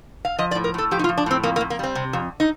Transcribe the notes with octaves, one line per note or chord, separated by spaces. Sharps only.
F5
F3 D#5
D5
A2
A#4
A2 A4
F3 G4
D#4
F4
F3
D4
A2 C4
F2 A#3
A#3
F2
A#3
G3 C4
C3
F2
D#4